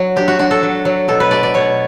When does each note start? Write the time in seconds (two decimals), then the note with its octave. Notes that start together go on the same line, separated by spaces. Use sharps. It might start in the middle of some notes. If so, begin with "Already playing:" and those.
Already playing: F#3
0.16 D4 G4
0.28 F#4
0.39 D4 F#4
0.51 A4
0.63 F#3
0.85 F#3
1.08 B2 A4
1.20 B4
1.31 A3 D5
1.43 D5
1.54 B2 C#5